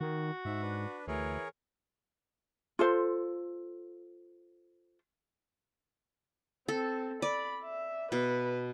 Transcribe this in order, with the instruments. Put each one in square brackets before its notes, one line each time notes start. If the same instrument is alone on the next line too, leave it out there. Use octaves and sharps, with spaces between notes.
[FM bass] D#3 [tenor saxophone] F#4
[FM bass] G#2 [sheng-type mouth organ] E5
[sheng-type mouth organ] D4 B4
[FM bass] D2 [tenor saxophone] E3 [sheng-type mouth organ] G#4 A#4 C#5
[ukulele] F4 A4 C5
[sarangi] C4 [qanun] A4
[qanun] D5 [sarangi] B5
[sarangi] E5
[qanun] B2 [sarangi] B4